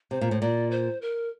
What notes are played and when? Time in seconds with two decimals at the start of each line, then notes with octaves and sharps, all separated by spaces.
0.11 C3 C5
0.21 A#2
0.31 A2
0.41 A#2 D5
0.71 C5
1.02 A#4